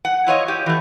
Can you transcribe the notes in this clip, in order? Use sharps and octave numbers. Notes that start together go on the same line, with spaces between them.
F#5
E4 F4 C#5 D#5
G4
E3 A3